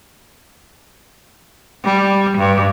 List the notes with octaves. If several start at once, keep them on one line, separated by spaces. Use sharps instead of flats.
G3
G2